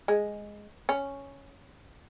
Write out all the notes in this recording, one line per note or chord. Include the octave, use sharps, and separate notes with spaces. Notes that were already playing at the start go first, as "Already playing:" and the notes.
G#3
C#4